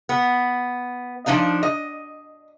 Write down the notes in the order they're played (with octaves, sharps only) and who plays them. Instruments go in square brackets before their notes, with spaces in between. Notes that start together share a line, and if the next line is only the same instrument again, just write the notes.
[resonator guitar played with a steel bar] B3
F3 C4 D4 D#4 F5
D#5